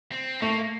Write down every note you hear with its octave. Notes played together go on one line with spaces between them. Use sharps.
C4
A3 A#3